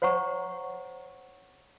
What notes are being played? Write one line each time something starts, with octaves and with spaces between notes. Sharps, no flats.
C5 C#5 F#5 A#5 C#6